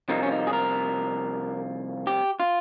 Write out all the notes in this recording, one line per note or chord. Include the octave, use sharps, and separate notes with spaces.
C2 C3 F3 A#3 D#4
C#4
D#4
G#4
A#4
G4
F4